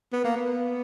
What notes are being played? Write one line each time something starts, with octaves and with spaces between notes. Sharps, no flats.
B3
A#3
B3